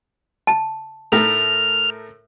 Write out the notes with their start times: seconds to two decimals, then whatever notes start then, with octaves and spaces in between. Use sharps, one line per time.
0.47 A5
1.12 A2 A3 A#4 F6